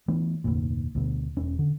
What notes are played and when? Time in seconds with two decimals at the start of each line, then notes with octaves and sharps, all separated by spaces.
0.08 E3 A3 B3
0.44 F1 D2 A#2
0.95 D2 B2
1.36 E1 C#4
1.59 D3